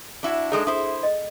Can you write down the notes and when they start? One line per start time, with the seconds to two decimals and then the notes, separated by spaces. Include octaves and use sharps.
0.23 D4 E4 F#4
0.52 G#3 D4 D#4 G#4 A4
0.67 E4 C5 D#6
1.03 D#5